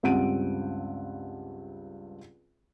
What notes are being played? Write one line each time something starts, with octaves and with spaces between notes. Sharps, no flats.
C#2 G2 C4 F#5 D7 D#7